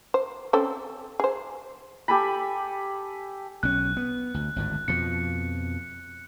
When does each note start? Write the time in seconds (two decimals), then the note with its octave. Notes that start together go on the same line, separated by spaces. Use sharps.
0.14 C5
0.53 C4 C#4 A4
1.20 G#4 C5
2.08 G4 A4 G#5 B5
3.63 B1 C#4 F#6
3.97 B3
4.34 D2
4.56 G#1 D2 A2
4.88 F2 B2 F3 C#7